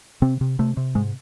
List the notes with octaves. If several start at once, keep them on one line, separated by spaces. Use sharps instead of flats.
C3 C4
C3
C3 A3
C3
G#2 G#3